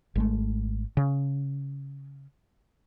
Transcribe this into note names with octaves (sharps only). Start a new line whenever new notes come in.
G#1 G#3 A3
C#3